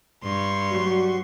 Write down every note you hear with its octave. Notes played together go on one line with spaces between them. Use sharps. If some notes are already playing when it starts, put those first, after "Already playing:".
G2 C6 C#6
F#3 G3 F#4